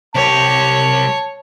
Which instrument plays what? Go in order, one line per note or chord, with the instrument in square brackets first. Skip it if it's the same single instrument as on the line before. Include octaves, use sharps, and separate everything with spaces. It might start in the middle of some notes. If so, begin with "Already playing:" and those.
[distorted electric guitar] C2 G4 [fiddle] C#5 [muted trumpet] A5